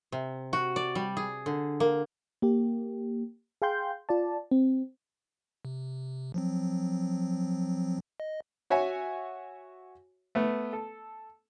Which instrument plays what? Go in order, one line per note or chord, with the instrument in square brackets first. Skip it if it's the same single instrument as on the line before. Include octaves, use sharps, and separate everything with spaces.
[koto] C3
F#4
D5
G3
G#4
D3
A#3
[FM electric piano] A#3 G4
G#4 F5 G5 C6 G6
F4 D5 A5
C4
[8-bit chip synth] C3
F3 F#3 C4
D#5
[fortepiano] F#4 C#5 E5 G#5
A3 B3
A4